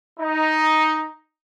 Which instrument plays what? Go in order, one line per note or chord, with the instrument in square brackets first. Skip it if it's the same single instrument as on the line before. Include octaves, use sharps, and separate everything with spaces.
[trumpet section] D#4